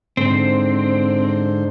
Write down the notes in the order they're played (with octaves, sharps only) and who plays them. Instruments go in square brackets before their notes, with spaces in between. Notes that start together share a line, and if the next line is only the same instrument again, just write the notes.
[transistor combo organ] G#2 D3 C5 [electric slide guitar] C4